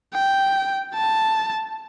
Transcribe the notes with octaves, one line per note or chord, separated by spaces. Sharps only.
G5
A5